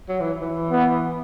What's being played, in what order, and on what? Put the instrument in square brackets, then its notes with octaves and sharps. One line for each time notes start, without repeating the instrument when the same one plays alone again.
[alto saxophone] F#3
E3
E3
[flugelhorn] B3